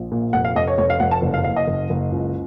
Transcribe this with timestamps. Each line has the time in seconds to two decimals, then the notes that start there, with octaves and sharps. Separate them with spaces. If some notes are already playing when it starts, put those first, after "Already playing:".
Already playing: A#1
0.12 A#2
0.33 F1 F#5
0.45 F5
0.56 F1 D#5
0.67 C#5
0.78 F1 C#5
0.90 F5
1.00 F1 F#5
1.11 A5
1.22 F#1
1.34 F5
1.44 F#1 F5
1.56 D#5
1.68 F#1
1.90 F#1
2.11 C#2